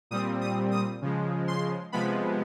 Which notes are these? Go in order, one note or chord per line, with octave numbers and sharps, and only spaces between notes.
A#2 G3 C4 D#6
D#6
D#6
C#3 F3 G#3
C6
C3 F3 G#3 B3 B5